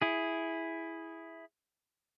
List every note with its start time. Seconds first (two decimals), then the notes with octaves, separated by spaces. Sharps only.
0.02 E4 G#4